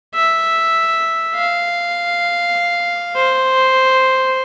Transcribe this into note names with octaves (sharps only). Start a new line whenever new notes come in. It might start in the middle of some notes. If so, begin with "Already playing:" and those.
E5
F5
C5